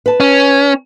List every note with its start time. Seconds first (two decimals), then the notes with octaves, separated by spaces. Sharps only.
0.06 B4 A5
0.20 C#4